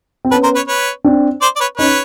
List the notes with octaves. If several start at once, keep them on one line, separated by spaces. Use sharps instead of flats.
C4
B3 C#4 A4 B4
A#4 C5
B4 C#5
B4 C#5
C4 D4
C5 D5
D5
B4 C#5
C#4 D#4 B4 C#5